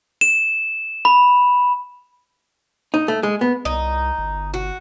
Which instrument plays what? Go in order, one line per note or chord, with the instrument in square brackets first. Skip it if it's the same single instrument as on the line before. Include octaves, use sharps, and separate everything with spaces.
[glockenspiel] E7
B5
[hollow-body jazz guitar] D#4
A3
G#3
B3
[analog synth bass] C2 [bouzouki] D#4
[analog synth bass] G1
[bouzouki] F#4